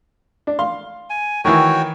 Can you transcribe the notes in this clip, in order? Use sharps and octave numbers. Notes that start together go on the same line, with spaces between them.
D4
F5 C6
G#5
D#3 E3 F#4 C#5 G5